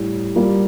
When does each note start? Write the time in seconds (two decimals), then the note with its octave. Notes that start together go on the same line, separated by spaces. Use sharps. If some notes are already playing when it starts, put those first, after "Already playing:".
Already playing: A2 G3
0.36 G3 A#3 F4